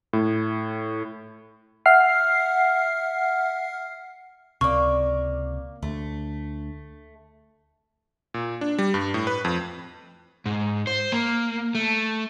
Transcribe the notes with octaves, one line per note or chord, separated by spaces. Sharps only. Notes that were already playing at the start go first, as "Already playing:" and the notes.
A2
E5 F#5 F6 C7
C#2 C3 A#3 D5 C#6
D2 A3
A#2
D4
G3
G2
A2
B4
F2
G#2
C5
A#3
A3